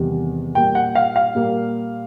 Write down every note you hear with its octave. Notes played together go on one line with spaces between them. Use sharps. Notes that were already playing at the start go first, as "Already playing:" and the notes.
Already playing: E2 C3 D#3 G3
A#2 G3 A#3 G5
F#5
F5
F5
A#2 G3 A#3